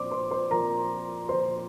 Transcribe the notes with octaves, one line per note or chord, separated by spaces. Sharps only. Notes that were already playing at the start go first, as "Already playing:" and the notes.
Already playing: A#2 F3 C5 D5 C6 D6
C5 C6
C5 C6
A#2 F3 A#4 A#5
A#2 F3 C5 C6